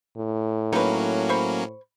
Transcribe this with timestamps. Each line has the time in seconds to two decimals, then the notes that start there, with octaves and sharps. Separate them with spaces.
0.17 A2
0.72 F#3 A#3 C#4 D#4 B4
1.29 C5 B5 C#6